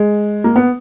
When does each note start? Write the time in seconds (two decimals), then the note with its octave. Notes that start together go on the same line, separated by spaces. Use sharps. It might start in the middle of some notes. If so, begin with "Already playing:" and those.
Already playing: G#3
0.44 A#3
0.56 B3